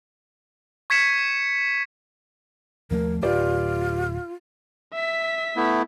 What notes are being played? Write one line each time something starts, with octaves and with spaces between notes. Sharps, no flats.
C#6 G#6 B6 C#7 E7
D#2 F3 A3 A#4
D1 F4 G4 B4 D5
E5 B6
A3 B3 E4